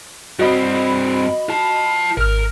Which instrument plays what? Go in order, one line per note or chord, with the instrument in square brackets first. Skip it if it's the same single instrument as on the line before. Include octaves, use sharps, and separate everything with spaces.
[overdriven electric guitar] G2 C4 [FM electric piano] F#4 D#5 B5
[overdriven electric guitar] F4 A5
[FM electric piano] G#1 F6 [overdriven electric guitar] A#4